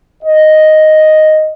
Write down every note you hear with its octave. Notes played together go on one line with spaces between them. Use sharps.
D#5